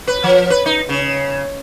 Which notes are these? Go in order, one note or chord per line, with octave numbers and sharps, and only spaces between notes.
B4
F3
B4
D#4
C#3